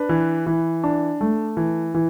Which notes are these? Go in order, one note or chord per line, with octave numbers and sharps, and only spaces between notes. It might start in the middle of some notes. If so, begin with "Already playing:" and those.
Already playing: D4 B4
E3
E3
D4
A3
E3
E3